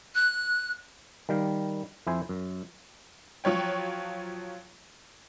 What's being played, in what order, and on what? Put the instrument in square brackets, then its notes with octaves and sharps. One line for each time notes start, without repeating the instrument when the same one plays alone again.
[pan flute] F#6
[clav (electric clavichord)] D#3 G3 F5 G5
F2 E4 C5 G#5
F#2
[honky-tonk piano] F3 F#3 C#5 G5